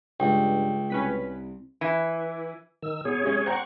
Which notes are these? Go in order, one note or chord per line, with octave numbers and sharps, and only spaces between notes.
C#2 G2 G5
C2 C#4 B4 B6
E3
D#3 E6
B2 G#4 C#5
C3 G#3 C#4
C5 F#5 G5 A#5 C#6